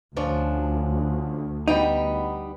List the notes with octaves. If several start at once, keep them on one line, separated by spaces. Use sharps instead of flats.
D2 F3 C#4 D4
G3 B3 D#4 G5